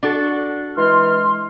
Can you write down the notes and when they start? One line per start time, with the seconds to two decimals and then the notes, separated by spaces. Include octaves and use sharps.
0.03 D4 F#4 A4
0.77 E3 G#3 C6 F6